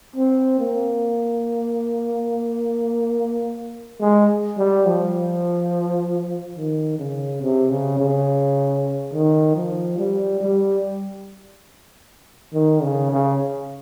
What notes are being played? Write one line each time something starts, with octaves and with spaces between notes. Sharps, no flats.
C4
A#3
G#3
G3
F3
D#3
C#3
C3
C#3
C#3
D#3
F3
G3
G3
D#3
C#3
C#3